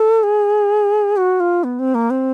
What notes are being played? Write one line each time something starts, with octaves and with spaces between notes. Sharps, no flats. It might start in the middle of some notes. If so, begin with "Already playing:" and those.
Already playing: A4
G#4
F#4
F4
B3
C4
A#3
C4